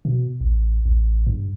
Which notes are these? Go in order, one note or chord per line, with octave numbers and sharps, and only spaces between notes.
B2
A1
A1
G2